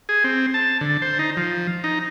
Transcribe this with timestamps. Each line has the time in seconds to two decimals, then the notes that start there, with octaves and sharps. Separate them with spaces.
0.09 G#4
0.24 C4
0.54 A5
0.81 D3
1.02 C5
1.19 D#4
1.37 F3
1.84 D#4